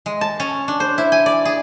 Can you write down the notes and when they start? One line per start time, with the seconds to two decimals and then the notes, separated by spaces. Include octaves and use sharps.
0.06 G#3
0.21 A5
0.40 C#4
0.68 D4
0.80 C5
0.98 E4
1.12 G#5
1.26 D5
1.45 G#4